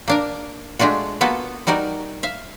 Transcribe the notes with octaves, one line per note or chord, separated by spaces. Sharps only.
A#3 D4 A#4
G#3 A3 D4 F4 F#4
A#3 B3 F4 F#4 A4
G3 D#4 F#4 A#4 D5
E5 F5